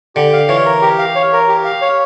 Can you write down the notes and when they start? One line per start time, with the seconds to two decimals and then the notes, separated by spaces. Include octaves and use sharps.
0.16 D3 G4
0.33 F5
0.49 E3 C#5
0.66 A#4
0.82 G4
0.99 F5
1.15 C#5
1.33 A#4
1.48 G4
1.65 F5
1.81 C#5